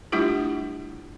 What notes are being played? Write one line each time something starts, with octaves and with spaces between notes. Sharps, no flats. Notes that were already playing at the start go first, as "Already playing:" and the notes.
G3 A3 D4 E4 F4 G4